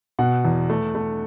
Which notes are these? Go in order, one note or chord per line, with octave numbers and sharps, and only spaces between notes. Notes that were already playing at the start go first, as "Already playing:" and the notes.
B2 F#5
E2
A3
A3